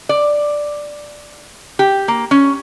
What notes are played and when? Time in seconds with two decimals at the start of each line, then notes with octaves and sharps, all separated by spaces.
0.09 D5
1.79 G4
2.08 A#3
2.31 C#4